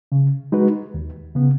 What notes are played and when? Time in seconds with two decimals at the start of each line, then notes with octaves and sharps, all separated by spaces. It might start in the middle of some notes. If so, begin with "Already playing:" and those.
0.12 C#3
0.52 G#3 D#4 F#4 B4
0.94 D#2
1.35 C#3 B3